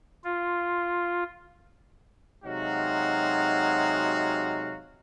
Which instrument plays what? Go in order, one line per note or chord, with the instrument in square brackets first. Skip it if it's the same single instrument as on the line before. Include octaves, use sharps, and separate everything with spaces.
[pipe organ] F4
[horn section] C3 F#3 G#3 D#4 F#4 F5